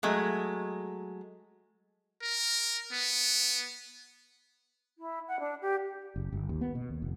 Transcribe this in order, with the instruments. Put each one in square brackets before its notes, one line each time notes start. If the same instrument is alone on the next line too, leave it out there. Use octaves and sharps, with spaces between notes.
[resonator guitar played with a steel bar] F#3 G#3 A3
[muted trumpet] A#4
B3
[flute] E4
F#5
D4
G4
[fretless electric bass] F#1
G1
D#2
B3
B2
D#2
F1